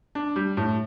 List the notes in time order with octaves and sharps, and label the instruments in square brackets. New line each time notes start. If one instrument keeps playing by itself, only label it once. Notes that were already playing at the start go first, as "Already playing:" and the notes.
[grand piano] D4
G3
A2